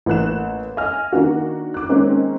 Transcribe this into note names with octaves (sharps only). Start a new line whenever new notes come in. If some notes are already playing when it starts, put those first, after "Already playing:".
A1 A#3 F#6 E7
D#5 G#5 F6
D#3 A#3 D4 F#4
D6 F#6
D#3 G#3 A#3 C4 C#4